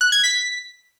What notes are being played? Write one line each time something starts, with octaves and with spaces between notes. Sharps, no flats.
F#6
G#6
B6